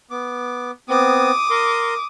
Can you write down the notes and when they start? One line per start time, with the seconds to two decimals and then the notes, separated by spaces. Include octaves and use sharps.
0.11 B3 D6
0.89 B3 C4 D6 D#6
1.50 A#4 C6